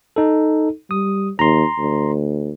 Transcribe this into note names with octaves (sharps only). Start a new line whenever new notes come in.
D#4 A4
G3 D#6
D#2 A#5 C6
D2